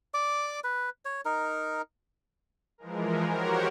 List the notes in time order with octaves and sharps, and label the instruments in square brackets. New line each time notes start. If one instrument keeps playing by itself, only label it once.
[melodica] D5 D6
B4
C#5
D#4 A#4
[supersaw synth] E3 F3 G#3 A#4
F#4 G4 A#4 C5 C#5 F#5